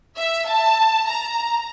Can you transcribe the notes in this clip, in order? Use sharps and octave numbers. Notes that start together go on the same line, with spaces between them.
E5
A5
A#5